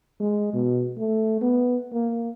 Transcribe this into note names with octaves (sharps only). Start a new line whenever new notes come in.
G#3
B2
A3
B3
A#3